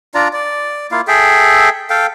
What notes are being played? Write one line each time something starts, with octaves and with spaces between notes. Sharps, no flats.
D4 F4 D5 A#5
D5
A#3 E4 F4 F5
G#4 A4 E5 G5
A4 F5 G5